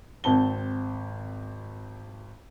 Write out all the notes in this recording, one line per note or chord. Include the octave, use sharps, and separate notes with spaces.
G#1 C4 A5 G7